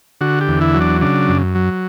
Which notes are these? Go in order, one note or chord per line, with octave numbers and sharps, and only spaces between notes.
D3 F#4
G4
E2
E4
F#3
D4
C#3 D4
F#2
F#3